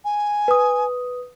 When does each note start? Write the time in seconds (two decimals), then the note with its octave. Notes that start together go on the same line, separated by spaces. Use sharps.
0.04 G#5
0.48 B4 D#6